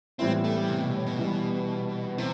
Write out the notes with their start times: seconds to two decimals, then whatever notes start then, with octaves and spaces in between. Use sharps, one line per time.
0.19 A2 E3 G3 B3 C4 E4
0.44 A3
0.56 G3
0.69 C3
0.81 B2
0.94 A2
1.06 B2
1.19 E3 G3 B3
2.18 C3 E3